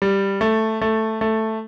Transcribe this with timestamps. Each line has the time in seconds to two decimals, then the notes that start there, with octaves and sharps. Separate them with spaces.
0.02 G3
0.41 A3
0.82 A3
1.21 A3